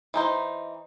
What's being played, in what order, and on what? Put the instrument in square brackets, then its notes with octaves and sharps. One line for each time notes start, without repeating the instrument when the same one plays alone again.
[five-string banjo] E3 D#4 C5